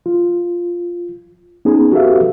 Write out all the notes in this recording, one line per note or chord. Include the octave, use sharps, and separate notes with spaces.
F4
B3 C#4 D#4 G#4
F#4 G4 A4 B4 E5 F5